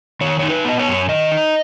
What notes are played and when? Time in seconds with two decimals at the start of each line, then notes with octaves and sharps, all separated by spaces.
0.21 D#3 C#5
0.39 D#4 C#5
0.50 B4
0.65 B3 D#5
0.79 C#5
0.88 F#2
1.09 D#3 D#5
1.32 D#4